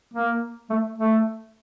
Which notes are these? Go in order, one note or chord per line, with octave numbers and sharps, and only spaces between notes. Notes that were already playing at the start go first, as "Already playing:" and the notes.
A#3
A3
A3